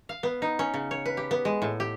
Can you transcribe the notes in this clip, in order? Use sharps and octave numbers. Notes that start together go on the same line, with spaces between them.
F5
B3
D#4
C#4
C#3
C#5
B4
G4
B3
G#3
A2
G4